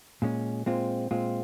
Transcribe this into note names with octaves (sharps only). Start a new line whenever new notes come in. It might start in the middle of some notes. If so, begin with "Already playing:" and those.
A#2 G#3 C#4
A#2 G#3 C4 F4
A#2 G#3 C4 F4